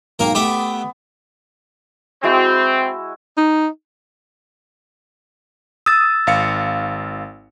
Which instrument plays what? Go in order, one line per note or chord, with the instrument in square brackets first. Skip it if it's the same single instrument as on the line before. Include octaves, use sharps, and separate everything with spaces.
[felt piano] B1 G#2 [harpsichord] A#3 A#4 [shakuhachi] G5
[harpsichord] A3 G4 E5 [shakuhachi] B3 [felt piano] D6
[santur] G#3 E4 F#4 [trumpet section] C4
[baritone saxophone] D#4
[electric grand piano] D#6 [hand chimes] E6 A6
[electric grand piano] G#1 F5 C#7